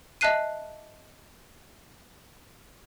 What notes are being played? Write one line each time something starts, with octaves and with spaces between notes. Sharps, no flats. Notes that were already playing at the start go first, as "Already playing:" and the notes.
D#5 E5 A5 F#6 C7 D#7